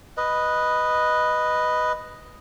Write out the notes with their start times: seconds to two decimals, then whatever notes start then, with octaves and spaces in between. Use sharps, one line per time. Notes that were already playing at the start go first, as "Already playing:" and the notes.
0.17 B4 D#5